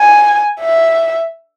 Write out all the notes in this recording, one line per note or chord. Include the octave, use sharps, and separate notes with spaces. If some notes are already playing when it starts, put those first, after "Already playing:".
Already playing: G#5
E5